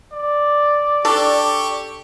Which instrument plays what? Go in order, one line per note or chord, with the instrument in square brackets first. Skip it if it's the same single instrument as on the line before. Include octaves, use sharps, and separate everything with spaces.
[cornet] D5
[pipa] D4 A4 [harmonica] G4 C#6